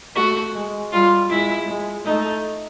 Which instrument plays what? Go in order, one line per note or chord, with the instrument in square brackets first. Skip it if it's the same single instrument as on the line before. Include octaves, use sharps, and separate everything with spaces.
[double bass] A3 [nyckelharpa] F#4
[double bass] G#3
[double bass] G3 [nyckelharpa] F4
[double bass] G#3 [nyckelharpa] E4
[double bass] G#3
[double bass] A3 [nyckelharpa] D#4